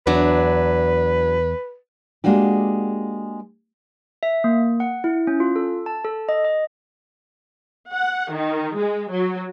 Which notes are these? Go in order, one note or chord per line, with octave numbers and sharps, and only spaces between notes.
E2 F#3 D4 B4
G#3 A#3 D4 F#4 G4
E5
A#3
F#5
E4
C#4
F4
A4
A5
A4
D#5
D#5
F#5
D#3
G#3
F#3